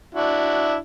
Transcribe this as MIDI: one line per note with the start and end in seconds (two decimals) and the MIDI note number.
0.15 0.76 62
0.15 0.76 64
0.15 0.76 66